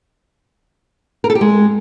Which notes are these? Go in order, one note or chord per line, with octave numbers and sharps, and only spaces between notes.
A#4
A4
G4
G#3